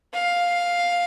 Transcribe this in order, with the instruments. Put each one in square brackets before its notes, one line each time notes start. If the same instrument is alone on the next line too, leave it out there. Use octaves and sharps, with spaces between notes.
[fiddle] F5